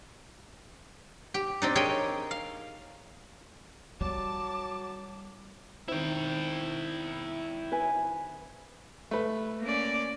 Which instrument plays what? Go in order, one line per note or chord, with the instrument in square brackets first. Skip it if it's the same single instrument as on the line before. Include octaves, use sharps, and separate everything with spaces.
[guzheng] G4
C4 D4 D#4
G4 G#4 A#4 C#5 D#5 G5
F5
[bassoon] F#3 [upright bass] G3 [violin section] A5 [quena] D6
[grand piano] D#3 C4 [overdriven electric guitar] E4 G5
[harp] B4 G#5
[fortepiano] A3 B4
[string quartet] A#3 C#4 D5